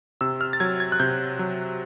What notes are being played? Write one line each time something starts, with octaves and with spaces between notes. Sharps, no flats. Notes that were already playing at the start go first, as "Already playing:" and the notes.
C3 E6
F6
A6
F#3 G#6
G#6
F#6
C3 G6
F#3